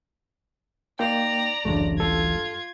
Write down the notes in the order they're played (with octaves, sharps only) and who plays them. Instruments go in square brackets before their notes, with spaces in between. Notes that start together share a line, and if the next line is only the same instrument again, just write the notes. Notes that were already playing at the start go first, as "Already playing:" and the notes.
[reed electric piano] A#3 D#4 G5 [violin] D5 A#5
[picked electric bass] D1 A1 A3 [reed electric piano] F#2 C#3 D4
[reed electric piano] G2 A4 [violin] F4 G#6